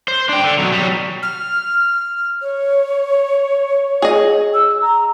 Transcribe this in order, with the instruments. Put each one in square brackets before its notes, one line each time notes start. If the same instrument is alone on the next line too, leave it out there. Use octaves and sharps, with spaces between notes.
[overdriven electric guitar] C5
D4 G5
D3
B2 F#3
F#3 G3
[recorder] F6
[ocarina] C#5
[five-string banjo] G#4 D#5
[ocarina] E6
A#5